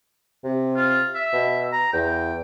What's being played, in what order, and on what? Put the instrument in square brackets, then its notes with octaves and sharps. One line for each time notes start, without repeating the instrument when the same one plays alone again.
[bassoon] C3
[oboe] F4
E5
[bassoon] B2
[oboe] A#5
[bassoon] E2 [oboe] G5